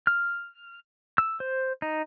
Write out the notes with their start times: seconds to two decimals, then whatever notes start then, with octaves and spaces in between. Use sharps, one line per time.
0.07 F6
1.18 E6
1.40 C5
1.82 D#4